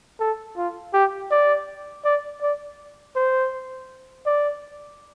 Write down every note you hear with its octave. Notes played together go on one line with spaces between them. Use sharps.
A4
F4
G4
D5
D5
D5
C5
D5